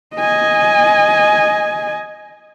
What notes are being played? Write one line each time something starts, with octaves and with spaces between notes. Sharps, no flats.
D#5 G#5